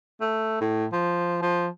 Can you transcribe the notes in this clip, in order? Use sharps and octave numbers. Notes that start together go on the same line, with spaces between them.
A3
A2
F3
F3